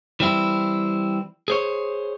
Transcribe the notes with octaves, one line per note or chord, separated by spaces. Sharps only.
E3 G3 C4 E4
G#4 C5 C#5